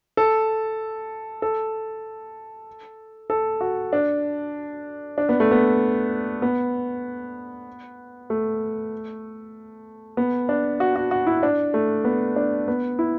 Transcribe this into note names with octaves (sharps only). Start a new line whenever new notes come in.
A4
A4
A4
F#4
D4
D4
B3
A3
B3
B3
A3
B3
D4
F#4
F#4
F#4
E4
D4
A3
B3
D4
B3
E4